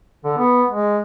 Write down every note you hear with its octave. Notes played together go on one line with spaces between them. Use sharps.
D3
B3
G#3